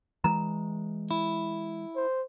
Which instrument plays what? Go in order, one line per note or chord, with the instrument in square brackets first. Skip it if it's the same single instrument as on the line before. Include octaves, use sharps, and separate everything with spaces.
[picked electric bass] E3 G#3 [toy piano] A#5
[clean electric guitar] E4
[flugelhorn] C5